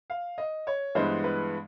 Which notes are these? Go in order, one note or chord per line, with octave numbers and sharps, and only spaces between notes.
F5
D#5
C#5
G2 E3 G#3 B3 C5
B4